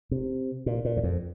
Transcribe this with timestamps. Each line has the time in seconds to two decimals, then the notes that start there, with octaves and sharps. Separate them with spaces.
0.11 C3
0.66 A#2
0.85 A#2
0.97 E2
1.03 F2